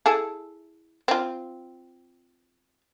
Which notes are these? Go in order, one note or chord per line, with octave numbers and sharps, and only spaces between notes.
E4 G#4 A4
C4 F4